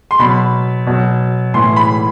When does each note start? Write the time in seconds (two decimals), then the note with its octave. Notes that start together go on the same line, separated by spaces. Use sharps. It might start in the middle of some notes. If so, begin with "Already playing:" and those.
0.11 C6
0.19 B2 F#3 B5
0.86 B2 F#3
1.54 A2 E3 C6
1.76 B5